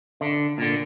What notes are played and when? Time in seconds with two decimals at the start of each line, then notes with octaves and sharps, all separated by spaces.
0.21 D3
0.58 A#2 D3